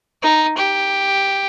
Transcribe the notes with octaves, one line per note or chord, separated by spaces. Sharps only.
D#4
G4